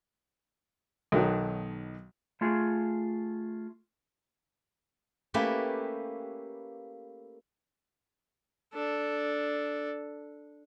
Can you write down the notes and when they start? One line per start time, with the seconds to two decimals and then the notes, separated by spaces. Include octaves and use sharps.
1.12 B1 B2 D#3 F#3
2.41 A3 F4 G#4
5.34 A3 A#3 C#4 E4 G4 B4
8.74 D4 A4